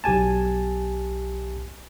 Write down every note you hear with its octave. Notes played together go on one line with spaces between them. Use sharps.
B1 G4 G#5 A5